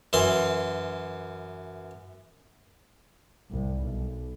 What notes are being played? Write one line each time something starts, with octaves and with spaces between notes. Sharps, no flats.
F#2 E3 C6
C2
B1